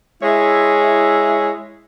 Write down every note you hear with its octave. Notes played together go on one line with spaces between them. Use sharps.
G#3 E4 C#5 E5